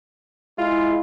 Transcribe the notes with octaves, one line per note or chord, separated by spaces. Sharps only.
G#3 E4 F4